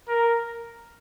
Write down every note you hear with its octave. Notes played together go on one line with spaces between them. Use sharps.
A#4